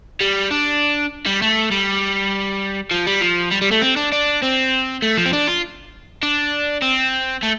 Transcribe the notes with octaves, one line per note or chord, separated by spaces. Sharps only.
G3
D4
G3
A3
G3
F3
G3
F3
G3
G3
A3
C4
D4
D4
C4
A3
F3
C4
D4
F4
D4
C4
A3